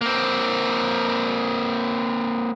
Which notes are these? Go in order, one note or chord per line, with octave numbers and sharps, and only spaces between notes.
A#3 C4